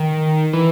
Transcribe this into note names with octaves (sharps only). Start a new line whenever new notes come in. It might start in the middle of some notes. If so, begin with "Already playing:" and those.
Already playing: D#3
E3